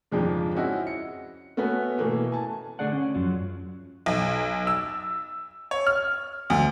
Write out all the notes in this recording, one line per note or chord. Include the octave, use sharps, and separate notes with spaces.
F2 G#2 C#3 F3 G#3 D4
C4 C#4 E4 F#4 D#5
C#7
A3 B3 C#4 F#4 B4
B2 E3 A3 A#3
G#5 A5
D3 A3 G#4 D5 F#5
C#4
F#2 F3 F#3
B1
E6
C#5
F6
D2